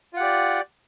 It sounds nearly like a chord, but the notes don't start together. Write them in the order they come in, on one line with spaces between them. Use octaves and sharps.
F4 F#5 G4 D5